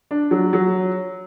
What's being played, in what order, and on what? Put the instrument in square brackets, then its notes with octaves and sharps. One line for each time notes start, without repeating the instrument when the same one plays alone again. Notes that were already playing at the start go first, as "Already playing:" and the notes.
[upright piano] D4
F#3
F#3